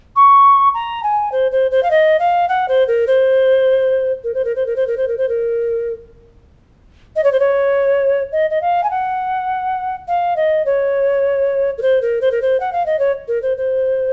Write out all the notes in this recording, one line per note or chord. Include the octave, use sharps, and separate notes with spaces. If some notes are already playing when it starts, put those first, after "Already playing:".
C#6
A#5
G#5
C5
C5
C5
F5
D#5
F5
F#5
C5
A#4
C5
A#4
C5
A#4
C5
A#4
C5
A#4
C5
A#4
C5
A#4
D#5
C#5
C5
C#5
D#5
D#5
F5
G#5
F#5
F5
D#5
C#5
A#4
C5
A#4
C5
A#4
C5
F#5
F5
D#5
C#5
A#4
C5
C5